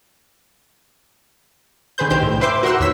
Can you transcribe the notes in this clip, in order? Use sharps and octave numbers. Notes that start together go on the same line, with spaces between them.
D3 D#3 G#4 B4 C5 G6
C2 D#3 G4 C5 G6
A2
B4 C5 E5 C6 D6 G6
F#4 A#4 F#5 C6 E6 F#6
D#2 C#5 E6 B6